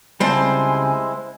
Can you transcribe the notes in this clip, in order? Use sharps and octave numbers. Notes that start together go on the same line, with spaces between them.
C#2 G3 G#3 C4 E4 C5 G#5 A5